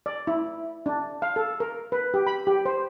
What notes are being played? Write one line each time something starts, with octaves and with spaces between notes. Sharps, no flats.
D5
E4
D4
F5
A4
A#4
B4
G4
B5
G4
C5